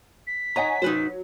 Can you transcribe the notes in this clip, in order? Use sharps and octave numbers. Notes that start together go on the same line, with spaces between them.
B6
C#5 D#5 F#5 G#5 A#5
F#3 D#4 B4 C5